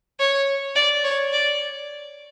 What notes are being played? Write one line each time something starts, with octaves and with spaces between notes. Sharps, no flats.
C#5
D5
C#5
D5